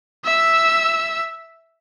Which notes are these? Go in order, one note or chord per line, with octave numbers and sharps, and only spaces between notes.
E5 E6